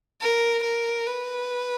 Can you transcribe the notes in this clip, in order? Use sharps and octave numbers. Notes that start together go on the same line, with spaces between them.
A#4
A#4
B4